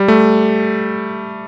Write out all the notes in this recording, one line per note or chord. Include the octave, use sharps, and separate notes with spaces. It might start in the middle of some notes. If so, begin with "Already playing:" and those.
Already playing: G3
A3